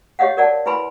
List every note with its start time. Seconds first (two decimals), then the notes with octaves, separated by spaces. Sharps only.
0.19 G4 C#5 D#5 F5 F#5
0.37 A#4 D5 F#5 A5
0.66 E4 B4 G#5 B5 C6